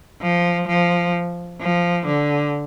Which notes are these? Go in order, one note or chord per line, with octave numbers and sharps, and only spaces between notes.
F3
F3
F3
D3